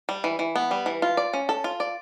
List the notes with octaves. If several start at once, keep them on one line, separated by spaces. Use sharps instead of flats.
G3
E3
E3
B3
G3
E3
F4
D5
C#4
A4
F4
D5